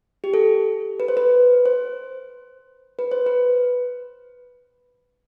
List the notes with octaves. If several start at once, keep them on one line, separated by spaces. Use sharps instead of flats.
G4
A4
B4
C5
B4
C5
B4
C5
B4